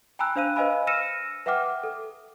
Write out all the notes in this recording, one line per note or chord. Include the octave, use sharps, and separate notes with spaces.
G5 G#5 A#5 B5 E6 F#6
D4 C5 F5 E6 D#7
B4 C5 D#5 F5 G#5 B5
E6 F6 A#6 C#7 D#7 E7
B4 E5 F#5 G5 D6 F6
A4